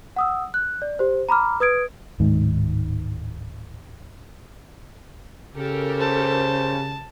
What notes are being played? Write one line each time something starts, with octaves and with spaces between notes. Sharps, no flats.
F#5 D#6 E6
F#6
D5
G4 C5
A#5 B5 D6 F6
B4 D#6 G#6 D7
D1 G#2 D#3
C#3 G4 A4 A#4
C5 A5